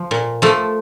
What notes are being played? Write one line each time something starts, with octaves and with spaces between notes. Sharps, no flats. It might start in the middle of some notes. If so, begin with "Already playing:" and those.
Already playing: F3
A#2
F3 A3